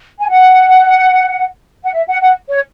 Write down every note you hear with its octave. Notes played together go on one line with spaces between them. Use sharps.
G#5
F#5
F#5
E5
F#5
F#5
C#5